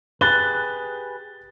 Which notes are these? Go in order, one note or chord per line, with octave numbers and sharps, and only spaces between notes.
G4 G#4 B4 F#6 A6 G7